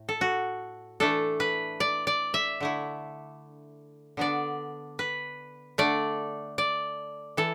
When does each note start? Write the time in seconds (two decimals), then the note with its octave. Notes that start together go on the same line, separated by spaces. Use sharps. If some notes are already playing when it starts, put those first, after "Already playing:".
Already playing: A2
0.09 A4
0.21 F#4
1.00 E3 A3 D4 A4
1.40 B4
1.80 D5
2.07 D5
2.34 E5
2.60 D3 A3 E4
4.17 D3 B3 D4 D5
4.99 B4
5.78 D3 A3 D4 D5
6.58 D5
7.37 E3 A4